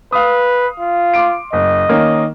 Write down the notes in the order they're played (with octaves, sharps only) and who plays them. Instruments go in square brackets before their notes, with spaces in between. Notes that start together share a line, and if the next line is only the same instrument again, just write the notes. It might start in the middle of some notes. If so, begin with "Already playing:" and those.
[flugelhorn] B4 [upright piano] F5 D#6
[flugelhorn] F4
[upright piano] C6 D6 D7
[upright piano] F#1 [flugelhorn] D#5
[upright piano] D#3 A#3 C#4